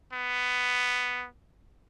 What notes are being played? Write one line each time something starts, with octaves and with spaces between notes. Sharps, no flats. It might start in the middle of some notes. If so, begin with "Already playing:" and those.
B3